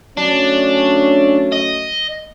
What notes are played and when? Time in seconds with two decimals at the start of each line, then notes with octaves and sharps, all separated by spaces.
0.18 F#3 A3 C#4 D4
1.52 D#5